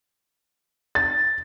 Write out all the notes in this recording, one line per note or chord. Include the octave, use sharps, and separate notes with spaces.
A6